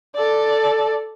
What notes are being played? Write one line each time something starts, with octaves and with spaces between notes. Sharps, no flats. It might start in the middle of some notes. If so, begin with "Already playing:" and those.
A4 D5